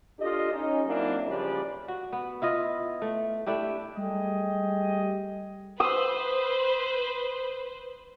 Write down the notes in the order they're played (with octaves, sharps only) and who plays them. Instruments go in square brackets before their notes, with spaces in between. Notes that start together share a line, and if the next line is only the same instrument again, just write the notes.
[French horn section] D4 F4 G4 A4 D#5
C#4 D#4
F#3 A#3 C4 D4 E4
C#3 F3 G3 G4 B4 D5
[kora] F#4
B3
E4 F4 D#5
A3
A3 D4 E4 G4
[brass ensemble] G3 A3 G4 G#4 D#5
[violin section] B4 C5 [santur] D#6 E6